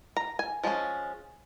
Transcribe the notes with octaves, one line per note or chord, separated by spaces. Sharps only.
A#5
G#5
F3 G#3 C#4